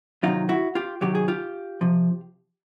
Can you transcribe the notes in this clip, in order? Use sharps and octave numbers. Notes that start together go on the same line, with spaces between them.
C3 D#3 F#3 D#4 F4
E4 F#4
F4 G4
C3 D#3 F#3 G4
G#4
F4 G4
C3 F3